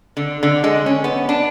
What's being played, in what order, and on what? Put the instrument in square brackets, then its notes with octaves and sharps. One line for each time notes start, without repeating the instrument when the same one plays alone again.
[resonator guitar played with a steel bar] D3
D3
G#3
C#4
B3
D4